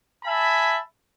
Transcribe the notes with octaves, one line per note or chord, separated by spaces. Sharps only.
E5 G#5 A5 B5